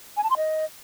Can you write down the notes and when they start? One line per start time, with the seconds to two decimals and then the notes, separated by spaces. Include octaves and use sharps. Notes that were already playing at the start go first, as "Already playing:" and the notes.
0.17 G#5
0.24 A5
0.30 C6
0.37 D#5